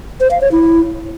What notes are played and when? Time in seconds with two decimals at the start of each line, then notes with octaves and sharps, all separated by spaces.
0.20 C5
0.31 F5
0.41 C#5
0.52 E4